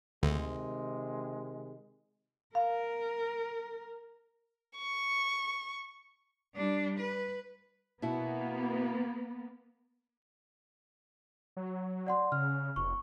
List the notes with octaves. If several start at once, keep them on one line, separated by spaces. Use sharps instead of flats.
D2 C3 D#3 G#3
A#4 F5
C#6
G3 D4
B4
B2 A#3 B3 E4 F#4
F#3
D5 F#5 C6
C#3 F6
F1 C#6